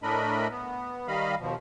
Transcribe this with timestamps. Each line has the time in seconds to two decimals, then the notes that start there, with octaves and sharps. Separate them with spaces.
0.03 A2 A3 D4 A#4 D#5 B5
0.51 B3
1.08 D#3 G3 D#5 F5 B5
1.39 D#2 B2 F3